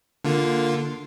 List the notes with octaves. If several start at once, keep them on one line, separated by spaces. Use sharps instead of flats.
D3 A#3 F4